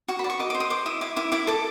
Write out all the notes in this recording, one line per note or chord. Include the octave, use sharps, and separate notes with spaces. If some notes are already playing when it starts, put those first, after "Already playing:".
F#4 C#6
B5
D5
C#6
D#5 D6
C5 D6
D#6
C5 D6
E4 D#6
E4 D6
E4 D6
E4 D6
A4 D6